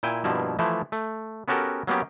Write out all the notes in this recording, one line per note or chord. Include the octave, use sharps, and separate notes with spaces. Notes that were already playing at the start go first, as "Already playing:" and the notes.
A#2 E4 G5 G#5
G2 B2 F3 A#3 E4
E3 F3 A3 E4
A3
B3 C#4 F#4 G4 A4 A#4
F#3 A#3 B3 C#4 G4